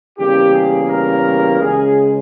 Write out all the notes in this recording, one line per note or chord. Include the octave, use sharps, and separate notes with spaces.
E2 C#3 G3 A#3 G4
G#4
A#4
C#2 C#3 G#3 G#4